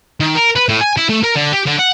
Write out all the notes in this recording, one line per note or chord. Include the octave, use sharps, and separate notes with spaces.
D#3
A#4
B4
A2
G#5
E4
A3
A#4
D3
G4
D3
F#5